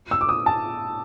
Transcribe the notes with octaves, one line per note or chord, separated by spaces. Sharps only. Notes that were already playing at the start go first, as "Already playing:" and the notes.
E6
D6
D#6
A5